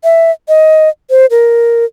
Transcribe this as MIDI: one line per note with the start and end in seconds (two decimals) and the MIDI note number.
0.04 0.31 76
0.48 0.89 75
1.10 1.26 72
1.31 1.85 70